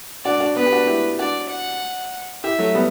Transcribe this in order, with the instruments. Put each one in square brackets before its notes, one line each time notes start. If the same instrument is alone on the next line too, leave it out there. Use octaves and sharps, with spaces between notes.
[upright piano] D4 F#4 [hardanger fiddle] D5
[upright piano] D4 F#4
[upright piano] B3 D4 [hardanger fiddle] B4
[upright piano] G4
D4 F#4
E4 G4
[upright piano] D4 F#4 [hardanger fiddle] D5
[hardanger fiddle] F#5
[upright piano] E4 G4 [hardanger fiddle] E5
[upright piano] F#3 A3
G3 B3